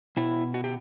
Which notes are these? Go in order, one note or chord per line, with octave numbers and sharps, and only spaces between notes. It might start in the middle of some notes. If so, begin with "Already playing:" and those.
B2 E4
F#4
G4